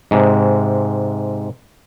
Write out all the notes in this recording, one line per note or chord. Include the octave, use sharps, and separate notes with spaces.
G#2 C3